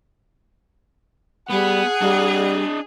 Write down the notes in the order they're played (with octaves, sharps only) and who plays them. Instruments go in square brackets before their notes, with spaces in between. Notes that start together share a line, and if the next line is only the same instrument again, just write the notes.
[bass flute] G3 [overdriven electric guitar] B3 [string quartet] G#4 [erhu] F#5
[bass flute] G3 [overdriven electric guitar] D4 D#5